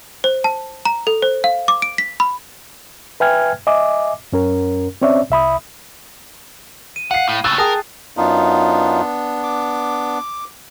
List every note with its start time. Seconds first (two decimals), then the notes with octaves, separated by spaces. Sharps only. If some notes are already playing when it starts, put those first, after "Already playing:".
0.24 C5
0.44 A5
0.85 A#5
1.07 A4
1.22 C5
1.44 F5
1.68 D6
1.82 D7
1.98 B6
2.20 B5
3.20 B4 E5 G5 G#5 F6 G#6
3.67 D#5 E5 G#5 D6
4.32 F#2 C#4 A#4
5.02 C4 C#4 C#5 D5 E5
5.30 C2 E5 B5 D#6
6.96 D#7
7.11 F5 F#5 C7
7.29 A2
7.44 A2 C#3 E6 F#6 A6 E7
7.58 G#4 A#4 G5 A5 D#6
8.17 F#2 B3 D4 D#4 F4
9.43 D6